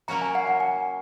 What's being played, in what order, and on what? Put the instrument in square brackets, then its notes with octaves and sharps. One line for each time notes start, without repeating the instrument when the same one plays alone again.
[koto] F#3 A#3 C#4 F#4 [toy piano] A#5
[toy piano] G#5
F#5
F#5
G#5